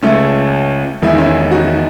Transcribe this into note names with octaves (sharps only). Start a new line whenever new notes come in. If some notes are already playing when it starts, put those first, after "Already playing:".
C#2 C#3 G#3 A3 C#4
E2 D#3 G#3 E4
D#4
C#4 E4
D#4 F#4